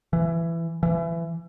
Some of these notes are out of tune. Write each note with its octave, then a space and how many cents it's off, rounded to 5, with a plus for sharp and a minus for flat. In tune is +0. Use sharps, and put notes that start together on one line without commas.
E3 +15
E3 +25